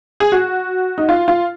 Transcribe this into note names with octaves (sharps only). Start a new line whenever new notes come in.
G#4
F#4
D#4
F4
F4